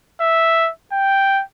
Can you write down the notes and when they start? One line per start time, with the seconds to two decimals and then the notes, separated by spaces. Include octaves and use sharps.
0.21 E5
0.92 G5